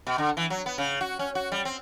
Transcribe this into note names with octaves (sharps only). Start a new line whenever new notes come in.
B2
D3
E3
F#3
B3
C#3
F#4
C#4
F#4
G3
C4